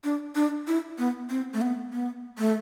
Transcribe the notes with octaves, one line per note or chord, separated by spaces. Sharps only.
D4
D4
E4
B3
C4
A3
B3
B3
A3